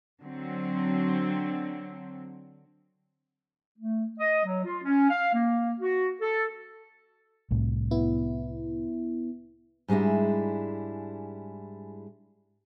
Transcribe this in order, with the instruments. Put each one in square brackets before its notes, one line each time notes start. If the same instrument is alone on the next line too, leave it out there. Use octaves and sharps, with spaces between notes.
[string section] D3 F#3 C4
[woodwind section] A3
D#5
F#3
F4
C#4
F5
A#3
F#4
A4
[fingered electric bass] C2 A2 C3
[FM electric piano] B3 E4
[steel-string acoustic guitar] G#2 G3 G#3 D4 E4